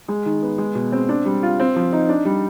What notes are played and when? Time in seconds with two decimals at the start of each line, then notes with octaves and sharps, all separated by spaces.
0.08 G#3
0.26 D#3
0.42 B3
0.58 G#3
0.75 B2
0.92 C4
1.09 D4
1.25 G3
1.43 F4
1.60 C4
1.76 F3
1.93 D#4
2.09 D4
2.25 G3